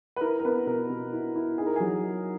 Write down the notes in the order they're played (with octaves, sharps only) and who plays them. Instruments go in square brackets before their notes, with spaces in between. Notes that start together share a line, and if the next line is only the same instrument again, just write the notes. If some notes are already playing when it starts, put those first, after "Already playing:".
[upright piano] B4
E4 A#4
A#4
B3 B4
B2 A#4
B2
E4
E4
D#4 G#4
A#4
F#3 G#4
D#4